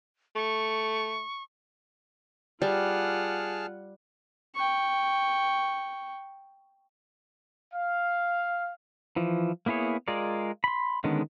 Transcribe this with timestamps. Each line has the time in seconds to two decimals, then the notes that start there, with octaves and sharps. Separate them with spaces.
0.36 A3 C#6
2.62 G3 F4 G#4 F#5 A5 F6
4.55 G5 C#6
7.73 F5
9.16 E3 F3
9.66 A#3 B3 E4 G#4 C#5
10.08 G#3 F4 G#4 A#4 D5
10.64 B5 C6
11.04 D3 D#3 G#3 B3 C#4